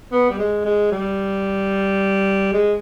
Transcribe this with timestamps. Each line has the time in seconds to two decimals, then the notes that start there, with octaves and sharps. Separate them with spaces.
0.11 B3
0.30 G3
0.38 G#3
0.65 G#3
0.92 G3
2.53 G#3